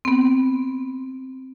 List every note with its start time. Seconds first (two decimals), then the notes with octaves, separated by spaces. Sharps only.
0.05 B3 C4